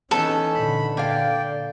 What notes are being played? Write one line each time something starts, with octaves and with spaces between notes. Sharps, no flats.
E3 B3 C#4 D#4 A4
A#2 D3 B5
A#3 D5 F5 G5